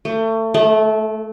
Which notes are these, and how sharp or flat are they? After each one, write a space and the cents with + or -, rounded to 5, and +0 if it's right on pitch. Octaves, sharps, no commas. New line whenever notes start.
A3 +30
A3 -20